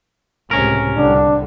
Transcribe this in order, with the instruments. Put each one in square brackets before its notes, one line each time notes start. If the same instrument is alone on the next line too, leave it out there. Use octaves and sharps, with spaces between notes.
[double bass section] C#2 A2 C3 [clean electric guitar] C#4 A#4
[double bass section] C2 D3 G3 [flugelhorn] D4